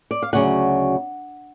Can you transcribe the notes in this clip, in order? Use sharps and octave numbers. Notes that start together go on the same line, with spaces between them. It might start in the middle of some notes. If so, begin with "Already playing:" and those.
D5
F5
D2 C#3 F#3 F#5